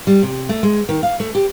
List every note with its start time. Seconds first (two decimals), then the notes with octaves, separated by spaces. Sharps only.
0.07 G3
0.23 C3
0.49 A3
0.63 G#3
0.89 D#3
1.03 F5
1.20 A3
1.35 G4